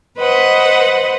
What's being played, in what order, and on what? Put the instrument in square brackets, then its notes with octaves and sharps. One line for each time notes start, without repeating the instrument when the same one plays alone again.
[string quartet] B4 C5 D#5 F#5